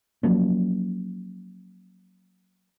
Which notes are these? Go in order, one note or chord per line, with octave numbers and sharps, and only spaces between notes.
F3 F#3 A#3 C#4